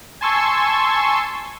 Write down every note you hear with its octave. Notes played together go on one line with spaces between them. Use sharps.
G#5 A5 C6 C#6 E6 G#6